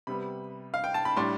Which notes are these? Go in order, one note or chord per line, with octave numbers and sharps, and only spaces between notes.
C3 G3 B3 B5
F5
G5
A5
B5
A2 G3 D4 C6